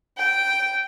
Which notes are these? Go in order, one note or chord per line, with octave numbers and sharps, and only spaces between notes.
G5